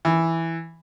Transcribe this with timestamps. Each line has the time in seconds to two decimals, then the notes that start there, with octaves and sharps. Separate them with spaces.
0.05 E3